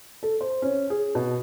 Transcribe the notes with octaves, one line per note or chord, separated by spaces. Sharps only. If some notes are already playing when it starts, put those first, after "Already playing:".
A4
C5
C#4
G#4
B2